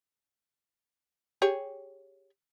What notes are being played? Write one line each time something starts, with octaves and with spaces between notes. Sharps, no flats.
G4 G#4 C#5